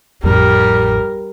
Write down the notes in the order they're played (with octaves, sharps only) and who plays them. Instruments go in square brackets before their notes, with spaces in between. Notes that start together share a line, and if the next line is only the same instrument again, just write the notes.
[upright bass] A1 F2 [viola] G3 G4 [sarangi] A#4